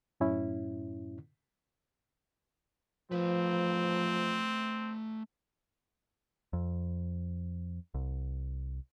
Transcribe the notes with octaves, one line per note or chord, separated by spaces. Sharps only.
F#2 A2 C#4 E4
F3 A3 C4 B4
F2
C2